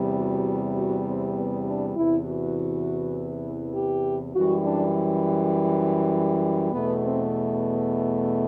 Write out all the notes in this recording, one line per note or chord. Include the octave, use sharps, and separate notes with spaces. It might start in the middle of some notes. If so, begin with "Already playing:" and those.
Already playing: E2 C3 G3
F#4
F#4
C4
B3
D4
E2 C3 E3 E4
F#4
G4
F#2 E3 G3 F#4
D4
E2 B2 A3 B3
C4